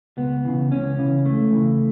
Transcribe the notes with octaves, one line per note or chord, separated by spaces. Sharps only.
C#2 B3
C#3 E3
C#2 C#4
C#3 E3
C#2 A3
C#3 E3